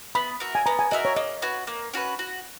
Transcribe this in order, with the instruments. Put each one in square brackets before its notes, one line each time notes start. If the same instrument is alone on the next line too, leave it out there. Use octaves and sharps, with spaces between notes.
[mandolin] B3 [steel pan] B5
[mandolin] F#4 A#4 E5
[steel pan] G#5
[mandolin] B3 [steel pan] A#5
[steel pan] G#5
[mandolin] F#4 A#4 E5 [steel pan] D#5
[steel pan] C#5
[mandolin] A#3 [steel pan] D#5
[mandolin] C#4 F#4 B4
A#3
C#4 F#4 B4
F#4